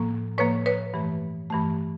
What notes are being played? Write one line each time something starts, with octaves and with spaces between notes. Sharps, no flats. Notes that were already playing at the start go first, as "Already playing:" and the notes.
Already playing: A2 F3 A#3
A2 F3 A#3 B4 C#5
B4 C#5
G2 E3 A3
G2 E3 A3